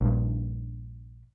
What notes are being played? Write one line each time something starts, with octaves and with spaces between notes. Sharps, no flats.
A#1 G2